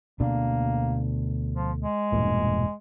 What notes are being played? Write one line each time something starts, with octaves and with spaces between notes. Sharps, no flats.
D2 B2 A#3 D4
F3
G#3
E1 G2 A#2